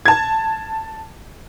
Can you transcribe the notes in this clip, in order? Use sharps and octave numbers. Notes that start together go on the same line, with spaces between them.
A5 G#6